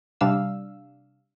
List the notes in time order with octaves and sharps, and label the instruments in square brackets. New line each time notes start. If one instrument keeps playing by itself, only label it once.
[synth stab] C3 G3 D4 F5 E6